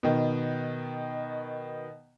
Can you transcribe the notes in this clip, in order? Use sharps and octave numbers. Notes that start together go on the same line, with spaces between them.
B2 D#3